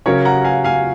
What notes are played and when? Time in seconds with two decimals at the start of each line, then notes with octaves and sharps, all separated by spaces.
0.06 C#3 F#3 C#4 A#4 C#5
0.25 F#5 A#5
0.44 F5 G#5
0.64 F5 G#5